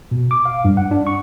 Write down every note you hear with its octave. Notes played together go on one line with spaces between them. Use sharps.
B2
D6
F5
G2
F#5
D4
C#6